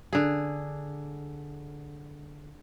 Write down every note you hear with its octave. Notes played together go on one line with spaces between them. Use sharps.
D3 G#4